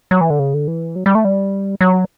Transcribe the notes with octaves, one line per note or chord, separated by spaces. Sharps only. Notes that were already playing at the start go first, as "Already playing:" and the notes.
F#3
E3
D3
C#3
D3
E3
F#3
G3
A3
G3
F#3